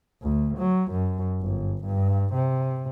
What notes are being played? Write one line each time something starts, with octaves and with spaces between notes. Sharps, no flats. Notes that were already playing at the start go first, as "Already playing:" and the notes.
D2
F#3
F#2
G1
G2
C3